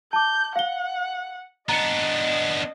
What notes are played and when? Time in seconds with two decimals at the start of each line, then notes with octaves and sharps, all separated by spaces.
0.13 A5 D6 G6
0.56 F5 F#5 G7
1.69 B3 D4 D#5 A#5 C#7